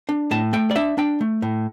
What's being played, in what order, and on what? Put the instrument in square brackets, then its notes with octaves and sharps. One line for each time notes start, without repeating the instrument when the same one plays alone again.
[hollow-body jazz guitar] D4
A2 A5
A3 G5
D5
D4 E5
D4 G5
A3
A2